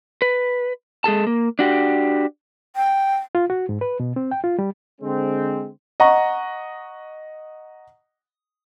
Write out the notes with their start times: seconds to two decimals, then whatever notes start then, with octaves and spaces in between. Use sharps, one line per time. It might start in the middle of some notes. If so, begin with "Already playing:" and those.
0.22 B4
1.04 G#3 G#4 A4 A5
1.27 A#3
1.59 D4 F#4 G4
2.76 G5
3.35 F4
3.50 F#4
3.69 G#2
3.81 B4
4.00 B2
4.16 C4
4.31 G5
4.44 F4
4.59 G3
5.01 D3 G#3 C4
6.00 D#5 F#5 A#5 C#6